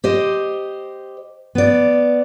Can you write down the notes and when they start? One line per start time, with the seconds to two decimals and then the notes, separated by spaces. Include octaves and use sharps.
0.04 G4 C5 D#5
1.55 B3 D5